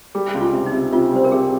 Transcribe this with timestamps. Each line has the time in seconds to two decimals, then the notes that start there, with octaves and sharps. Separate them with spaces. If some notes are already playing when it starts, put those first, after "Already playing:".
0.15 G3 G#4
0.34 C#2
0.41 F4
0.53 C3
0.66 D#4
0.73 C3
0.92 C3 F4
1.13 G3 C5
1.24 A#4
1.32 C3 G#4